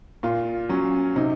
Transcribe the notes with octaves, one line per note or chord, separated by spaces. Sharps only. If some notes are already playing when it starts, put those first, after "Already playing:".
A#2 F4
F#3 C#4
C3 D#4